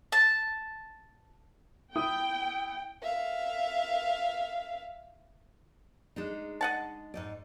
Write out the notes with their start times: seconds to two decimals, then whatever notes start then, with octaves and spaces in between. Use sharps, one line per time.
0.12 A5
1.96 E4 G5 D#6
3.02 E5 F5
6.16 G#3 D4 D#4
6.61 D#5 F#5 A5
7.14 G#2 D#4 D5